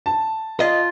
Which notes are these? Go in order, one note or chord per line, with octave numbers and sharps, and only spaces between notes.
A5
F4 D#5